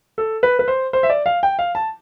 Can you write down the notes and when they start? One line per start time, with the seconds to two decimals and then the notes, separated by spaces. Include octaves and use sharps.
0.18 A4
0.43 B4
0.59 B4
0.68 C5
0.93 C5
1.03 E5
1.10 D5
1.26 F5
1.43 G5
1.59 F5
1.75 A5